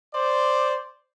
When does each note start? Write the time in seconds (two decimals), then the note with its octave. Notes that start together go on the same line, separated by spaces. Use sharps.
0.14 C5 D5